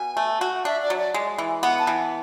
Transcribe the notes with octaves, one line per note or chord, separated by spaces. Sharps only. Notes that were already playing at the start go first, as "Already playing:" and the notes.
Already playing: B2 G#5
A3
F#4
D4 E5
D5
F#3
D5
G#3
E3
B3 F#5
A5
E3